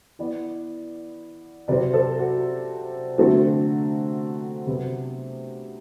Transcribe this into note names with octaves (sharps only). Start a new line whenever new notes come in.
E3 B3 B4 D5
C3 F#3 C4 B4 D5
A4 C5
F#4
D3 F#3 A3 C4 F#4 A4
F#4
C3 F#3 B3